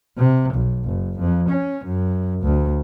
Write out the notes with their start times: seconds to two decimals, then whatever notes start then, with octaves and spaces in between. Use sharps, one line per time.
0.18 C3
0.54 B1
0.85 F#1
1.19 F2
1.49 C#4
1.85 F#2
2.43 D2